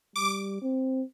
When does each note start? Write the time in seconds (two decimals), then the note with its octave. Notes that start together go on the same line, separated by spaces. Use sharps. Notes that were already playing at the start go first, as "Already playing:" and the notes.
0.16 G3 D6
0.62 C4